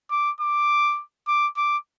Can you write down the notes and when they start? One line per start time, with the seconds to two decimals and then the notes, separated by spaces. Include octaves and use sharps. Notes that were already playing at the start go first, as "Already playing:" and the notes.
0.11 D6
0.41 D6
1.28 D6
1.57 D6